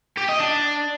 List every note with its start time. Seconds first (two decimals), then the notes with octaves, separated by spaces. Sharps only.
0.18 G4
0.29 D#5
0.40 D4